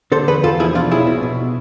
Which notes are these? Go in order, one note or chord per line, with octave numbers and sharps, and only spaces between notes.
D3 A4 C5
E2 G#4 B4
E2 F4 A4
F3 E4 G#4
B2 D4 F4
B1 E4 G#4
B2
B2